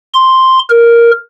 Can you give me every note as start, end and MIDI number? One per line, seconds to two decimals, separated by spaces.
0.14 0.59 84
0.70 1.11 70